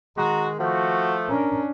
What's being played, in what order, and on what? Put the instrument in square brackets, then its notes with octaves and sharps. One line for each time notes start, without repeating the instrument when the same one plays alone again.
[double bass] D#3 [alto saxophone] G#3 [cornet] F#4 [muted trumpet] A#5
[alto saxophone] F3 [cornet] A3 [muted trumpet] F#4
[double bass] C#4 D4 [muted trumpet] A#4